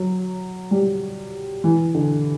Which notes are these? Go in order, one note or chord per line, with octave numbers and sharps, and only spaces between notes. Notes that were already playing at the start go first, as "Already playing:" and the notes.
Already playing: F#3
G3
E3
D3